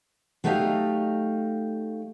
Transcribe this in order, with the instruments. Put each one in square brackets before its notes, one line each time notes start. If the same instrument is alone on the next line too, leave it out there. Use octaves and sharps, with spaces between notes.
[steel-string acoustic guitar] F#3 A3 D#4 G4 D#5 F5